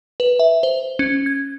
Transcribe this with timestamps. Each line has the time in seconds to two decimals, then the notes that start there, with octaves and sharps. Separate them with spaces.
0.20 B4
0.39 E5
0.63 C5
0.99 C#4
1.26 G#6